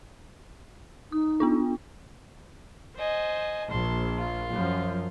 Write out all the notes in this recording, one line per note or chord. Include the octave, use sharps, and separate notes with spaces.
D#4 D#6
B3 D4 F4
C5 D#5 G#5
A#1 A5 C6
F4
F#2 F3